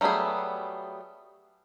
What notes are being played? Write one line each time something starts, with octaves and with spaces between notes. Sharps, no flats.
F#3 G3 A3 B3 G#4